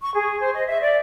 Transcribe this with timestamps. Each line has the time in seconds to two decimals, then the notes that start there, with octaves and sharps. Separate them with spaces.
0.01 C#6
0.15 G#4
0.40 C5
0.54 D#5
0.67 E5
0.81 D5